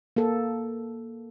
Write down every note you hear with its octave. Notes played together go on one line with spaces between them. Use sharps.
A#3 A4